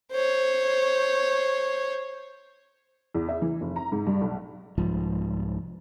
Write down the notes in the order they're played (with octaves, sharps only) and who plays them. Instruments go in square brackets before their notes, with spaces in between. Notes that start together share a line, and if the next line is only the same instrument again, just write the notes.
[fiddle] C5 C#5
[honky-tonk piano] E2
E5
E3
F1
A#5
G#2
G2
B1
[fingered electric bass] C2 G#2 F3